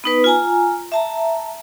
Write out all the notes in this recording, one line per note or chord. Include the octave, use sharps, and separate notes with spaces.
B3 D#4 B4
F4 G#5 A#5
E5 A5 A#5